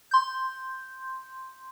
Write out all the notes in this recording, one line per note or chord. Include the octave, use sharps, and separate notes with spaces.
C6 G6